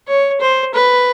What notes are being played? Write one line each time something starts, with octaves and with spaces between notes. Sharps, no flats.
C#5
C5
B4